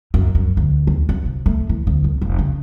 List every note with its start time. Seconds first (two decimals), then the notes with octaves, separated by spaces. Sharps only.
0.14 F#2
0.35 F#2
0.57 D2
0.87 D#2
1.09 F#2
1.26 C3
1.46 A3
1.69 E3
1.87 D2
2.04 C2
2.22 F1
2.39 C#3